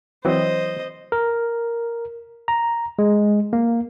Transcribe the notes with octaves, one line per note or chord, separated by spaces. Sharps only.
E3 F#3 C4 C5 D#5
A#4
A#5
G#3
A#3